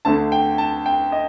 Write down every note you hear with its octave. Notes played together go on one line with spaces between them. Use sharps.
D2 D3 A3 A5
G5
A5
G5
D#5